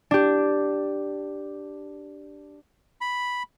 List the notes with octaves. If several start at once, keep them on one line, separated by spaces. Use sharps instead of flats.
D4 G4
B5